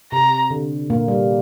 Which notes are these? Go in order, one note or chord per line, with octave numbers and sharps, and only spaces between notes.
C3 A#5
D3
A#2 A#3
G3